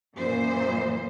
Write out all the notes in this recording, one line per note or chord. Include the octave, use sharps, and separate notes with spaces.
F#2 A#2 E3 A#3 C5